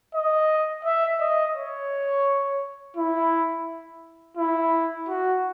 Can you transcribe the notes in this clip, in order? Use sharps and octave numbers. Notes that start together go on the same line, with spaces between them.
D#5
E5
D#5
C#5
E4
E4
F#4